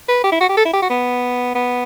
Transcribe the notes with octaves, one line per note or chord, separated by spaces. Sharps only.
B4
G4
E4
F#4
G4
A4
E4
G4
F#4
B3
B3